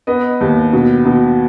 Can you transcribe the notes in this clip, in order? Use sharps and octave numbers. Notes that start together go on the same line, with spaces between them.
B3 D#5
D#2
B2
B2